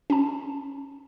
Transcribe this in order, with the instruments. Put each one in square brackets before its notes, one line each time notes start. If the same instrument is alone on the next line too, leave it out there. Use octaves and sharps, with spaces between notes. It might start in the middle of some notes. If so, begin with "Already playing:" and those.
[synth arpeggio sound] C#4 A5